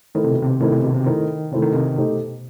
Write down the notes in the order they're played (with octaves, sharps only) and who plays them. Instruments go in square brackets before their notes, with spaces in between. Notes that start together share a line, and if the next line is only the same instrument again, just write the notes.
[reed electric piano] D#3 [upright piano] A3 E4 A4 C5
[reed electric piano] C3
B2
C3
[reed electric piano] D#3 [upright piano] A3 E4 A4 C5
[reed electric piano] C3
B2
C3
[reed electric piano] D#3 [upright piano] A3 E4 A4 C5
[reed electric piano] C3 [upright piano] A3 E4 A4 C5
[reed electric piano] D#3
C3
[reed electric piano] B2 [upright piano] A3 D#4 G4 C5